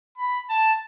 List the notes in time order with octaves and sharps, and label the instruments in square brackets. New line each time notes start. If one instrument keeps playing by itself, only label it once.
[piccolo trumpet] B5
A5